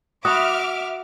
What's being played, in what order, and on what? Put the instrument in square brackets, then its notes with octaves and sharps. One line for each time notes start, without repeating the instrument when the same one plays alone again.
[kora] F#4 [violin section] E5 D6 F6 [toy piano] B5 D#6